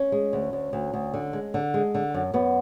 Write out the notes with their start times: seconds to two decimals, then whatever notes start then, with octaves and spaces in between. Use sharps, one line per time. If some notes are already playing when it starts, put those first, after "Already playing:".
Already playing: C#4
0.12 G#3
0.33 D2
0.53 D2
0.73 D2
0.94 D2
1.14 D3
1.33 G#3
1.54 D3
1.74 G#3
1.95 D3
2.14 F#2
2.34 F#2 B3